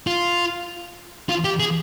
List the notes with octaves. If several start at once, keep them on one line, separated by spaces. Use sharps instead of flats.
F4
F4
G4
G#4